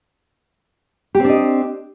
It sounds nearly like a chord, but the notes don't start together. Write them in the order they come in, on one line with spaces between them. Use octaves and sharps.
G4 C4 D4 D#5